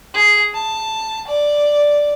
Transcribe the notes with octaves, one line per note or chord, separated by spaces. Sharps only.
G#4
A5
D5